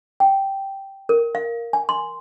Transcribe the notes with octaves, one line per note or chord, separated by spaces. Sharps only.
G5
A#4
F5
G#5
C6